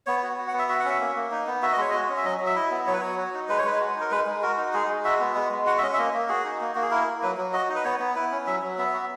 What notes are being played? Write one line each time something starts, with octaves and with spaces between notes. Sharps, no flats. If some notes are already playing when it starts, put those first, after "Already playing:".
B3 C#5
F#4
F#4
F#5
B3
E5
F#4 E5
F#5
C#4 E5
A#3
A#3
D#4
B3
F#4 E5
D#5
G#3 C#5
F#4 D#5
C#4
E5
F#3 D#5
F#3
E5
E4 D#5
B3
F#3 C#5
B4
F#3 C#5
F#4
D#4
G#3 B4
C#5
G#3 B4
F#4
D#4
A#4
G#3 B4
G#3
F#4 A#4
D#4
G#3 G#4
G#3
F#4 E5
B3
G#3
G#3
F#4 F#5
E5
C#4 D#5
E5
A#3 D#5
A#3
F#4 G#4
D#4
A#3
A#3 F#4
G#4
E4 A#4
A#3
F#3 B4
F#3
F#4 D#5
D#4
B4
B3 C#5
B3
E4 B4
C#4
F#3 E5
F#3
B3 E5
F#4